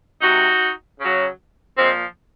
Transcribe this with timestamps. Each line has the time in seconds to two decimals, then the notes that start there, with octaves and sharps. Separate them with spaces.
0.20 C3 F#3 D#4 F#4
0.98 C#3 F#3
1.77 A#2 F3 G#3 C4